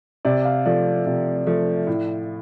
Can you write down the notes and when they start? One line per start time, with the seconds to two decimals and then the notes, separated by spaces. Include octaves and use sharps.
0.25 C3 D5
0.45 F5
0.66 F3 A3 D5
1.07 C3
1.47 F3 A3
1.87 A2